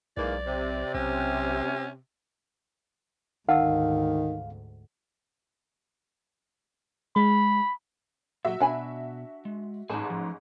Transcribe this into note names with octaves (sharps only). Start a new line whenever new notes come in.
B1 G#2 E3 A#3 D5
C3
B1 C#4
D2 G#2 D#3 F5 F#5 A5 E6
G#3 B5
A#2 F#3 F#4 E5
B2 D4 G#5 B5
G#3
A1 G#2 G#3 G#4 A5
F3